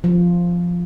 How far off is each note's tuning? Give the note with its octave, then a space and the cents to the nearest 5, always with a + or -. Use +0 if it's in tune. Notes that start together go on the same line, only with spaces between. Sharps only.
F3 +0